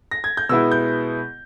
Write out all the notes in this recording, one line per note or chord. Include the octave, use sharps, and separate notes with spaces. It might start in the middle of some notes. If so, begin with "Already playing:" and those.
A#6
G#6
G6
B2 G#3 B3 E4 E6
G6